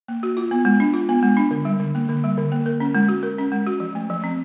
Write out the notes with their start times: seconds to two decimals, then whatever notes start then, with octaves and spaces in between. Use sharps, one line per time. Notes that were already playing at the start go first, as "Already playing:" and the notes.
0.08 A#3
0.23 F#4
0.37 F4
0.51 B3
0.65 G#3
0.80 D4
0.93 F4
1.09 B3
1.23 G#3
1.37 D4
1.51 D3
1.65 G3
1.80 D3
1.95 A#3
2.09 D3
2.24 G3
2.37 D3
2.52 A#3
2.66 A#4
2.80 C#4
2.95 G#3
3.08 F#4
3.23 A#4
3.38 C#4
3.52 G#3
3.67 F#4
3.80 F3
3.95 A3
4.10 F3
4.24 C4